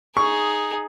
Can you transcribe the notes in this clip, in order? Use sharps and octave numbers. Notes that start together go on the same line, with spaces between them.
D#4 G#4 C#6